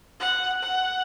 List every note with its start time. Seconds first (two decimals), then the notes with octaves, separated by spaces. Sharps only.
0.20 F#5
0.63 F#5